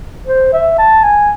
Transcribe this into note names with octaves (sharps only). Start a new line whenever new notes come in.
C5
E5
A5
G#5